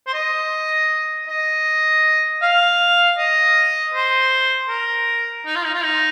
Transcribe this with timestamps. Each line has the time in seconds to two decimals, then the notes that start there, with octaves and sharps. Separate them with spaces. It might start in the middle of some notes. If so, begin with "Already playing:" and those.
0.07 C5
0.14 D#5
1.28 D#5
2.42 F5
3.18 D#5
3.94 C5
4.69 A#4
5.45 D#4
5.55 F4
5.65 D#4
5.74 F4
5.83 D#4